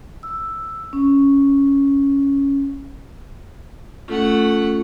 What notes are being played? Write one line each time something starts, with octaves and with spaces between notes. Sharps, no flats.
E6
C#4
A3 C#4 F4 F#5